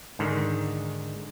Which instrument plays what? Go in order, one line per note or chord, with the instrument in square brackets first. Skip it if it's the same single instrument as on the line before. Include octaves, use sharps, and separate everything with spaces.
[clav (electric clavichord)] G#2 D3 D#3